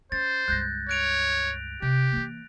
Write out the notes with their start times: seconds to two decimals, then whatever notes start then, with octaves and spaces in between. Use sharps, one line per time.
0.12 C#4 C5 A6
0.48 C#2 G2 F#6 G6 A#6
0.89 C#5 F#6 D7 F7
1.82 C3 E4 G4
2.12 E3 A#3